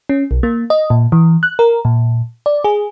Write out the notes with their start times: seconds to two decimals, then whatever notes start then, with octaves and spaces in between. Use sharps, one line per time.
0.09 C#4
0.31 B1
0.43 A#3
0.70 D#5
0.90 A#2
1.12 E3
1.43 F#6
1.59 A#4
1.85 A#2
2.46 D5
2.64 G#4